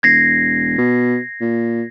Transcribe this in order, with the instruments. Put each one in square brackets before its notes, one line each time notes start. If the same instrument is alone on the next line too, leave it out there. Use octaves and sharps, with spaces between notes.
[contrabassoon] E1 [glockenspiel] G#6 A#6 C7
[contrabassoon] B2
A#2